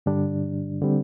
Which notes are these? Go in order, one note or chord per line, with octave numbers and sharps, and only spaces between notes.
G2 D3 G3 D4
D3 G3 C4